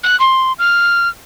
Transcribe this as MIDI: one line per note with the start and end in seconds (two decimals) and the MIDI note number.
0.03 0.18 90
0.20 0.53 84
0.59 1.08 89